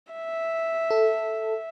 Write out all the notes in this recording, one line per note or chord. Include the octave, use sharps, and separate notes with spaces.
E5
A4